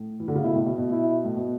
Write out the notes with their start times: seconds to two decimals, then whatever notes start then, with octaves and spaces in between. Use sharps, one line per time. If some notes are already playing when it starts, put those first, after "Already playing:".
Already playing: A2
0.20 E3
0.28 D3
0.35 C#3
0.43 B2 E4
0.55 A2
0.66 B2
0.78 B2
0.90 E4
1.24 A2
1.36 B2